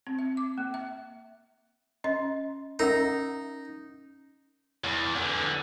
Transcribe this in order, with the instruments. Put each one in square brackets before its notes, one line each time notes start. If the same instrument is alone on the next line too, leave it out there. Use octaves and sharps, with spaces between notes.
[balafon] C4
E5
D6
A#3
E5
[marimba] C#4 C6 [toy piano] D#5
[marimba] C#4 [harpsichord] D#4 [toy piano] A#4 E5 F#5
[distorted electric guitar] E2
E2 D3